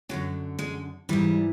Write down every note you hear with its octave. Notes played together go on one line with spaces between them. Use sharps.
F#2 D3 F3 F#3
G#3
G#2 E3 G3